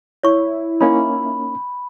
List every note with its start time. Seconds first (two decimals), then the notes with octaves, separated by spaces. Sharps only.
0.23 E4 C#5 C#6
0.81 A#3 C#4 D#4 B5